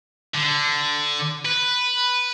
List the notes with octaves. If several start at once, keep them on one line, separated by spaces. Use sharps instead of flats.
D3
B4